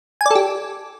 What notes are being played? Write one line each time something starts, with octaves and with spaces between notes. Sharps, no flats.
G4 A4 D5 G#5